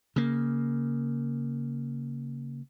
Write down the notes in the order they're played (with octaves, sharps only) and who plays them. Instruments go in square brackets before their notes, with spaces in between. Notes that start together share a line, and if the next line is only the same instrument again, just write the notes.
[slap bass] C#3 A#3